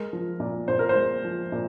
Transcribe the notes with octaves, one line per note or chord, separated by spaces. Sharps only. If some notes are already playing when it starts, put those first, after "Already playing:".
Already playing: G#3 A#4
F3
A#2
A#2 C5
A#4
C5
G#3
F3
A#2